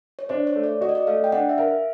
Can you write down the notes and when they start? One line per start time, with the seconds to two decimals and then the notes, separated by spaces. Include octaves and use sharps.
0.19 C#5
0.29 D4 C5
0.47 C#5
0.56 A3
0.64 D5
0.81 F#4 D#5
0.89 D5
0.95 D#5
1.07 A3 F5
1.24 G5
1.32 D4 F#5
1.49 E5
1.58 A#4 F5